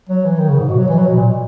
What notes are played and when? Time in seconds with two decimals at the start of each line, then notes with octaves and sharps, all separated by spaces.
0.09 F#3
0.25 E3
0.39 D#3
0.49 C#3
0.59 G#2
0.68 B2
0.78 F#3
0.88 E3
0.98 F#3
1.07 B2
1.17 A#2